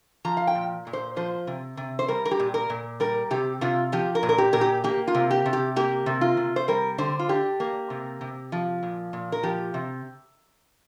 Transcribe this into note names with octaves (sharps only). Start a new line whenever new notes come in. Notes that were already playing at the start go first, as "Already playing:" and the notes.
F3 A#5
F5
G5
A#2
A#2
C5
F3 C5
C3
C3
C5
G3 A#4
A#4
G4
A#2
A#4
A#2
G3 A#4
C3 G4
C3 F4
F3 G4
A#4
A#2
A#4
G4
A#2 A#4
G4
A#3 G4
F4
C3
G4
C3
G4
A#3 G4
C3
F4
C3
C5
G3 A#4
D3 C5
F4
D4 G4
A#3
C3
C3
F3
A#2
A#2
A#4
F3 G4
C3